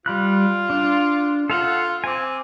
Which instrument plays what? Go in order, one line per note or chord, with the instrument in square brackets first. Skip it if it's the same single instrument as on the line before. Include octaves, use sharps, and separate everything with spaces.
[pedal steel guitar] G3 B5 F#6 [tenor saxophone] F4
[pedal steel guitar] D4
[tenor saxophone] F4 [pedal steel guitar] A4 F5 F#5
[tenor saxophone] C4 [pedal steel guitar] G#5 D6